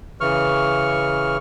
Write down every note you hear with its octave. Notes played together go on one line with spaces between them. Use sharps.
C#3 E3 C#6 F6